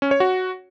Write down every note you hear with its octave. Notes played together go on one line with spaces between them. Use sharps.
C#4
C#5
F#4